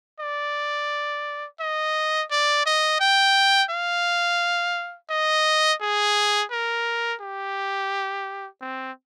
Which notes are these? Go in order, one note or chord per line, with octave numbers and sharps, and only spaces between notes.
D5
D#5
D5
D#5
G5
F5
D#5
G#4
A#4
G4
C4